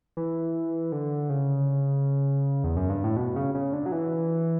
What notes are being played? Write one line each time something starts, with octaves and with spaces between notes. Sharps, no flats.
E3
D3
C#3
E2
F#2
G2
A2
B2
C#3
C#3
D3
F#3
E3